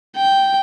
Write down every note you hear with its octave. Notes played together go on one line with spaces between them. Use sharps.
G5